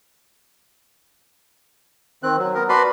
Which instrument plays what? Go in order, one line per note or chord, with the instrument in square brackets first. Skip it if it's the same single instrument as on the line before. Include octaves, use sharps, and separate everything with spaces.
[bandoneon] D#3 C4 F#6
F#3
B3 A#4
F#4 B4 D5 A5 B5 C6